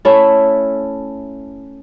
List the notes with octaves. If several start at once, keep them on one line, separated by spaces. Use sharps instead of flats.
A3 C#4 E4 A4